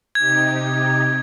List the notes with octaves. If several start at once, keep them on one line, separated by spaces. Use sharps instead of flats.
C3 D#4 G4 G#6